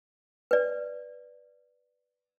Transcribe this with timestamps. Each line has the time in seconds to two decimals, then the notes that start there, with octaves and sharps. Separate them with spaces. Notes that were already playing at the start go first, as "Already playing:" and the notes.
0.51 B4 D5